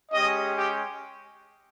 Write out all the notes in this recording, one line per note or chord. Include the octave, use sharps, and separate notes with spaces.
G#3 C#4 G4 D#5
G4